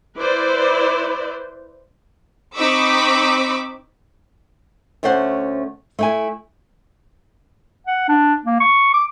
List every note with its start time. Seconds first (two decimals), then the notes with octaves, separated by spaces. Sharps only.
0.19 E4 B4 C5 D5
2.55 C4 D#4 B5 C#6 D6 E6
5.03 D2 A3 C#4 C5 F#5
5.99 A3 E4 G#5
7.87 F#5
8.08 D4
8.45 A#3
8.60 C#6
8.94 D6